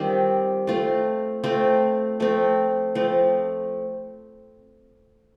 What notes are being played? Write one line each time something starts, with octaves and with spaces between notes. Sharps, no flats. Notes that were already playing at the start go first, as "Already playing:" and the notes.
Already playing: D#3 G3 C4 F4
A3 C4 F4
A3 C4 F4
F3 A3 C4
F3 A3 C4